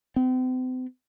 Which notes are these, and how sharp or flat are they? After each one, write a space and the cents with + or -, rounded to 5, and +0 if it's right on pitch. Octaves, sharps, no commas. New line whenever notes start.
C4 -40